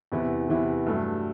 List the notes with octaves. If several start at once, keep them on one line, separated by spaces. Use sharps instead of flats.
E2 C3 E3 B3 E4
E2 C3 E3 B3 E4
G2 F#3 A3